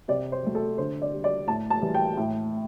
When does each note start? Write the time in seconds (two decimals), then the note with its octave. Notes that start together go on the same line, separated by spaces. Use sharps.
0.08 C3 D5
0.32 C5
0.43 F#3 A3
0.55 A4
0.78 D3 C5
1.02 D5
1.13 G3
1.24 D5
1.47 A2 A5
1.70 A5
1.82 E3 G3
1.94 G5
2.17 A2